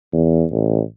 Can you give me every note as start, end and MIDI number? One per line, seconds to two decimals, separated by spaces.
0.13 0.44 40
0.51 0.81 33